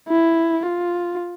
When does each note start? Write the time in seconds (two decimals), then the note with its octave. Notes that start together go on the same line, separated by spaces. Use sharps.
0.09 E4
0.66 F4